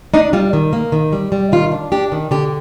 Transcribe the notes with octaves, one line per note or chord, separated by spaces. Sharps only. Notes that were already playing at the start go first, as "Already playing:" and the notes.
D4 D#4
G3 F4
D#3
A#3
D#3
G3
G3
D#3 F4
D4
D4 G4
D#3
D3 G4